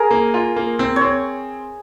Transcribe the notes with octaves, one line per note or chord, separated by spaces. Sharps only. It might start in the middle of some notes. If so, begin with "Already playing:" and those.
Already playing: G#4 A#4
A#3
F4
A#3
C4
C#5
C4